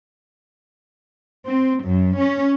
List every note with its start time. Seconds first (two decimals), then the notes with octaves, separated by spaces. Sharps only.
1.48 C4
1.84 F#2
2.19 C#4